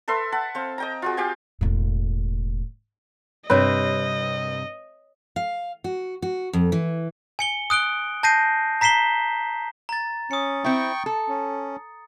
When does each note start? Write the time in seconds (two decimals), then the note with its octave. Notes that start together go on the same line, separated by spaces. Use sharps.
0.08 A4 B4 E5 C6
0.32 F#5 A5 B5
0.55 C4 F5
0.78 D#5 G5 A#5
1.02 F4 F#4 G#4
1.17 G4 F5 G5 G#5
1.61 E1 A2
3.50 G2 C3 C4 B4 C#5 D#5
5.36 F5
5.84 F#4
6.22 F#4
6.53 F2
6.72 E3
7.39 G#5 C#7 G7
7.70 D#6 F#6 D7 G7
8.23 A5 G6 A#6 C7 D#7
8.81 A#5 B6 C7 E7 G7
9.89 A#5 A6
10.31 C#4 D#6 C#7
10.64 C4 E4 G5 C#6
11.06 A4
11.29 C#4